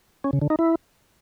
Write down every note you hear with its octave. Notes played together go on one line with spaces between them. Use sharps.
C#4
C#3
D3
D#4
E4